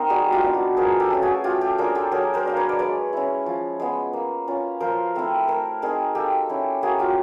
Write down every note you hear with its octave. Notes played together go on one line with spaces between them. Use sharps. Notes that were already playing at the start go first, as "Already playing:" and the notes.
Already playing: C4 D#4 A#4 C5 D#5
G3 F#4 G#4
F4 G4
B3 D4
F#4
F3 G#4 A#4
G4 A4
A3 C#4 A4
F#4 G#4
A3 F4 G4
G4 A4
D4 F4 G#4 A#4
G4 A4
F#3 G#4 A#4
A#4 C5
A#3 D4 C5
B4 C#5
D5
G#3 B4 C#5
C#4 E4
F3
G#3 B3
A#3
C#4 F4
F3 A#4 C5
A3 C4 E4
A3 A#4 C5
C4 D#4 G#4 A#4
A#3 G4 A4
C#4 E4
A#3 F#4 G#4
F4 G4